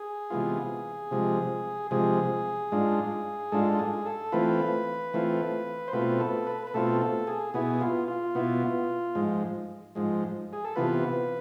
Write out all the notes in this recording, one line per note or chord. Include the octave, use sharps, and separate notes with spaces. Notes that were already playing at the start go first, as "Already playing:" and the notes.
Already playing: G#4
C3 E3 G#3 B3 F4
C3 F3 G#3
C3 F3 G#3 G#4
G#2 G#3 D4 F4
G#2 G#3 D4 F4 A4
F4
G#4
A4
E3 A3 C4 F4 B4
E3 A3 C4 F4
C5
B2 A3 C4 F4 B4
A4
B4
B4
B2 A3 C4 F4 A4
A4
G#4
B2 B3 E4 G#4
F4
F4
B2 B3 E4
G#2 F3 G#3
G#2 F3 G#3
G#4
A4
C3 E3 B3 F4 B4